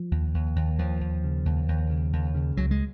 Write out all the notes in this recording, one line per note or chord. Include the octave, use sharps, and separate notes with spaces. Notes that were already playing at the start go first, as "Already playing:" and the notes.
Already playing: F3
D#2
D#2
D#2
D#2 F3
D#2
C#3
D#2
D#2
C#3
D#2
C#3
C#2 F#3
G#3